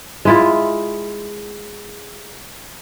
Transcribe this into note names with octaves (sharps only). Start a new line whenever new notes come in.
G#3 E4 F4